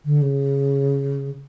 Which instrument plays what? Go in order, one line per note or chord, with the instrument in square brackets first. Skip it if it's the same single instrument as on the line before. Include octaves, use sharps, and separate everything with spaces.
[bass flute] D3
C#3